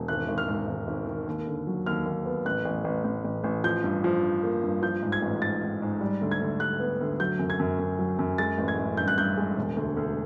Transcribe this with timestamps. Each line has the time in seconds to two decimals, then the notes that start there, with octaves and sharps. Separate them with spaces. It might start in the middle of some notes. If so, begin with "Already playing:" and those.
Already playing: E1
0.08 G#1 F#6
0.28 G#1
0.38 F6
0.48 G#2
0.67 G#1
0.87 G#1
1.07 D#3
1.27 D#2
1.47 D3
1.67 F#3
1.86 D#2 F6
2.06 D#2
2.26 B3
2.45 A1 F#6
2.65 A1
2.84 A1
3.04 A1
3.24 A1
3.44 A1
3.64 F3 G6
3.84 G2
4.04 F3
4.23 G2
4.43 A#3
4.63 G2
4.82 F3 G6
5.02 G#2
5.12 G#6
5.22 A1
5.42 G#2 A6
5.62 G#2
5.82 G#2
6.01 G3
6.21 D2
6.31 G#6
6.41 D2
6.60 G3 F#6
6.80 B3
7.01 D2
7.20 F#3 G6
7.39 F#2
7.50 G#6
7.59 F#2
7.79 F#2
7.99 F#3
8.19 F#2
8.38 G#3 A6
8.58 A1
8.68 G#6
8.78 A1
8.97 G2 G6
9.08 F#6
9.18 G2 G6
9.38 G#3
9.57 E1
9.76 D2
9.97 D2